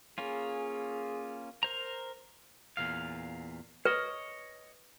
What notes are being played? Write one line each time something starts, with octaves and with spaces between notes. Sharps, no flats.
A#3 C#4 F4 G#4
A#4 C5 A#5
E2 A#2 F5
B4 C#5 D#5